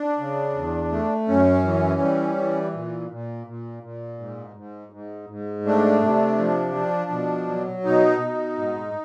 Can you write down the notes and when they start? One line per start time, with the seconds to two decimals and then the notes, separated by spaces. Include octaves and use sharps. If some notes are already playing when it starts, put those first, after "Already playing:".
Already playing: D4
0.19 C#3
0.55 E2
0.92 A3
1.28 F#2 C#4
1.64 E3
2.01 G3
2.37 E3
2.74 A#2
3.11 A#2
3.47 A#2
3.83 A#2
4.19 G#2
4.56 G#2
4.92 G#2
5.29 G#2
5.65 A3 D4
6.02 C3
6.38 F3
6.75 F3
7.11 B2
7.48 F#3
7.85 B2 D#4
8.20 B2
8.58 G#2